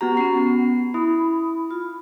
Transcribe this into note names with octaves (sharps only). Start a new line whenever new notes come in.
B3 F#4 G4 A#5
B3 C#4 C7
E4 B5 D#6
F4